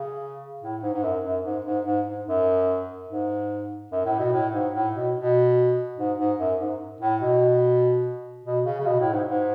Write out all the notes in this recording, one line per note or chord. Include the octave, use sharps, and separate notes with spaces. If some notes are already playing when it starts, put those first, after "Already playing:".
Already playing: C#3
A2
G#2
G#2
F#2
F#2
G#2
G#2
G#2
G#2
F#2
G#2
F#2
A2
B2
A2
G#2
A2
B2
B2
G#2
G#2
F#2
G#2
A2
B2
B2
C#3
C#3
B2
A2
G#2
G#2